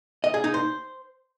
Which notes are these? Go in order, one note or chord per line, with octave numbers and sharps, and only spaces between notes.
D#5
G#4
D#4
C5